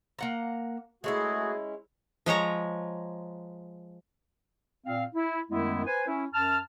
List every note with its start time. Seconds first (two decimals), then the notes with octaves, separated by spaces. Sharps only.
0.19 A#3 F#5 A#5
1.04 G#3 A3 C#4 E4 F#4 G#4
2.26 F3 G#3 C#5 A#5
4.85 A#2 C4 F5
5.15 E4
5.50 F#2 D#3 G#3 A3 B3 E4
5.86 B4 C5 G#5
6.07 C#4 E4
6.33 F#2 A5 F6